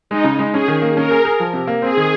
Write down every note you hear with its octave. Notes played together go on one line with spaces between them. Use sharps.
G#3 D#4
C#3
G#3
C#4 G#4
D#3
A#3
C#4 A#4
G#4
G#4
F3
C3
A#3
C4 G#4
D#3